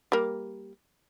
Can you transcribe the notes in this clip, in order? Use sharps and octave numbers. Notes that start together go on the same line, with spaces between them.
G3 A#3